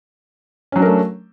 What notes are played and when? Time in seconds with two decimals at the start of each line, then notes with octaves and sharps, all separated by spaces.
0.72 C#4
0.76 F#3
0.79 D4
0.82 A#4
0.85 A3